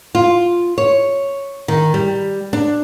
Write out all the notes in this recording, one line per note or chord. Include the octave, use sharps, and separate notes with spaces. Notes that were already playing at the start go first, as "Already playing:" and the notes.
F4
C#5
D#3
G3
D4